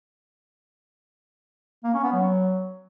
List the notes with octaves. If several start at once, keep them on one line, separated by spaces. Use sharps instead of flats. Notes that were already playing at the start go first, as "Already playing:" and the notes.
A#3
C#4
B3
F#3